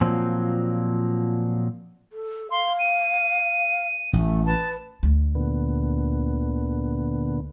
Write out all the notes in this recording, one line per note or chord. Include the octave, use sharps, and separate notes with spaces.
A#2 F3 F#3 A#3 C4
A4
F5 C6
D#7
A1 A3
B4 A5
D2
A#2 D3 B3